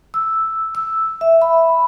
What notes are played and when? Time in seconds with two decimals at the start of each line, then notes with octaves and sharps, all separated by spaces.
0.14 E6
0.75 E6
1.21 E5
1.42 B5